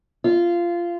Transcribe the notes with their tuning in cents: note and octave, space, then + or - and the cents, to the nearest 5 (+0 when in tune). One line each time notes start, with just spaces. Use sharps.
F4 -15